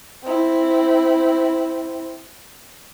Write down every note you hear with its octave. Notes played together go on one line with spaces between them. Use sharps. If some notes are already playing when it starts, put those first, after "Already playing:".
C4 E4